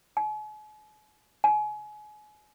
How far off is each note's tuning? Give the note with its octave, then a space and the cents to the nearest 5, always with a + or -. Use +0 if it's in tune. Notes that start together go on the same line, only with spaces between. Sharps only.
G#5 +45
G#5 +30